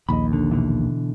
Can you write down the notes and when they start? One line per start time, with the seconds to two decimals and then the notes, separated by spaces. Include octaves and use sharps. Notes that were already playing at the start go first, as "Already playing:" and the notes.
0.09 A#1 D#2 D#5 B5
0.33 D3
0.51 B2 D3 E3